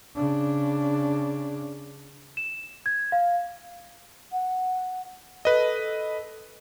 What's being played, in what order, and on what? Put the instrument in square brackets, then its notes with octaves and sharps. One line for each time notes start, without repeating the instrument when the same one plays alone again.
[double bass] C#3 D4
[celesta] E7
G#6
F5
[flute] F#5
[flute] A4 [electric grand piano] B4 D#5